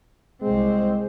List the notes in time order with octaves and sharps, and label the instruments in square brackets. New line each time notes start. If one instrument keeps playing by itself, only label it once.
[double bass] C2 C4 [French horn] G#3